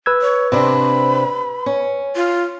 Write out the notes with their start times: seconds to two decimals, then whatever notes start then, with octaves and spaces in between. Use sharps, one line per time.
0.06 B4 E6 G#6
0.22 C#5
0.52 C3 C4 D4 B5
1.66 C#4
2.16 F4